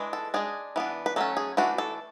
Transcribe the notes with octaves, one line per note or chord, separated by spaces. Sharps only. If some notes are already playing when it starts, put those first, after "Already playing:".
Already playing: E3 G#3 D4
A4
G#3 D4 G#4
E3 B3 D4
B4
F#3 A3 C#4 A4
G#4
E3 A3 D4 F#4
A4